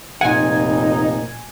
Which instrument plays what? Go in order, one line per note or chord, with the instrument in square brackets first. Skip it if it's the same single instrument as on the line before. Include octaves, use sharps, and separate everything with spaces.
[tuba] F1 [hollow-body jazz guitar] A#2 F#5 [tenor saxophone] D#4 [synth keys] G#5